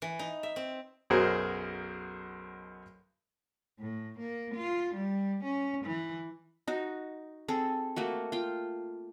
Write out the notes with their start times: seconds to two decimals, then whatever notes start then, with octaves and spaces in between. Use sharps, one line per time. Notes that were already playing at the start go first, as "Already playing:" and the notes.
0.02 E3
0.19 D#4
0.43 E5
0.56 C4
1.10 B1 F#2 B2 G#4 A#4 C5
3.79 A2
4.19 A#3
4.55 F4
4.95 G3
5.44 C#4
5.85 E3
6.68 D#4 F#4
7.48 C4 G#4 A4
7.96 A3 A#3 F#4
8.32 F4 G5